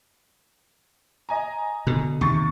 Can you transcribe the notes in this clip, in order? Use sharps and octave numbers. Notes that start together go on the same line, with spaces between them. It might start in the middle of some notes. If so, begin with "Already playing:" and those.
D#5 G#5 A#5
B2 D3
D#2 C3 C#6 A6